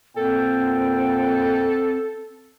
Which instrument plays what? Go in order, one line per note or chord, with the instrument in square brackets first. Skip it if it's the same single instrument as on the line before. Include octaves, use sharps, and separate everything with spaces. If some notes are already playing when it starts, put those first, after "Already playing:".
[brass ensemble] A#2 F#5 G5 [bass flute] C4 [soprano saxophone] A4